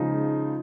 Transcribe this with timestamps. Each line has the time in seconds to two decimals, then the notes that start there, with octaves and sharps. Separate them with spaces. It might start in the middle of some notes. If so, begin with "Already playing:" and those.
Already playing: C#3 F3 G#3 D#4